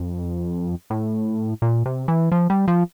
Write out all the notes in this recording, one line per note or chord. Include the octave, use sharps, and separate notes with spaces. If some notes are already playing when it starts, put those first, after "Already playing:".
Already playing: F2
A2
A#2
C3
E3
F3
G3
F3